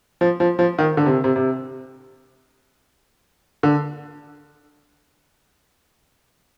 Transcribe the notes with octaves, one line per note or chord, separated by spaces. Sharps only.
F3
F3
F3
D#3
D3
C3
C3
C3
D3